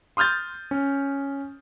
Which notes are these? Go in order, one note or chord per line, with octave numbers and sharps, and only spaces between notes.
C6 D#6 F6 G6 A6
C#4